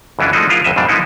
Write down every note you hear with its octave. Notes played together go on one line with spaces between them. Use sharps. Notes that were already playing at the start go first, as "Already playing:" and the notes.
C#2 F#2 E3 C#4 D4
F3 G#3 A3 D4 D#4 F#4
F3 E4 F4 G#4 A#4 D#5
G#1 F2 D#5 E5
F2 G#2 B2 G3 D4
F3 G#3 A#3 B3 D#4 E4